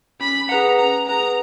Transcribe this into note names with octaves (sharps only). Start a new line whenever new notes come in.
C#4 B5
G#4 B4 F#5 A#5
C#4 A#5
G#4 B4 F#5 A#5